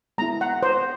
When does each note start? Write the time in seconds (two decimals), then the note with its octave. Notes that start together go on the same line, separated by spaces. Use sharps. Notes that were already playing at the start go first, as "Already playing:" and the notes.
0.18 G#3 B3 E4 A#5
0.41 F#5
0.63 C5